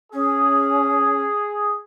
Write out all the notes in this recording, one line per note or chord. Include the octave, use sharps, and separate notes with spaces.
C#4 G#4